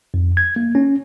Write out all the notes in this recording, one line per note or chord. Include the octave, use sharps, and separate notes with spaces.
F2
G#6
A#3
C#4